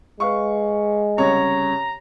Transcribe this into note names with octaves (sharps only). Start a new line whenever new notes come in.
G#3 B4 F5 C#6
C2 C#3 C#5 A#5